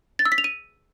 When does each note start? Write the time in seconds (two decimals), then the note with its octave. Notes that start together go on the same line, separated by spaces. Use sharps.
0.19 A6
0.25 E6
0.32 B6
0.38 F7
0.44 D#7